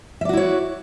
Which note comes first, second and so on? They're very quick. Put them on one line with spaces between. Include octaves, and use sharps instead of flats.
E5 D5 F#4 E4 C#5